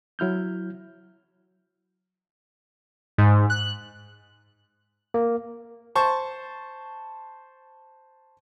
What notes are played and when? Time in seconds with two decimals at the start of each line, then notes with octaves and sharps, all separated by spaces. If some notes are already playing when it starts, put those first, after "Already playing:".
0.19 F#3 E4 F6 G6
3.18 G#2
3.50 F#6
5.14 A#3
5.95 C5 A5 C#6